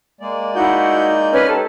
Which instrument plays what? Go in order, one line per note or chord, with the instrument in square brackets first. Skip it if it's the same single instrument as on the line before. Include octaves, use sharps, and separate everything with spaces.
[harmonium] G#3 A#3 D5
[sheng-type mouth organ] D#4 G6 [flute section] E4 F#4
[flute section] C#4 B4 F6
[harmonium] D#4 G4 [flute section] A4